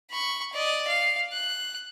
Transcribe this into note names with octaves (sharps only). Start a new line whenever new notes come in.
B5 C#6
D5 D#5
F5
F#6